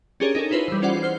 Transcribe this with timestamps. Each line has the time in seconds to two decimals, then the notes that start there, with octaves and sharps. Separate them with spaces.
0.20 C#4 D4 G4 G#4 A#4 C#5
0.35 D#4 G#4 A4
0.51 E4 F4 B4 C5
0.68 E3 G3
0.82 C#4 F4 C5 D5 F#5
1.02 C5 F6 C7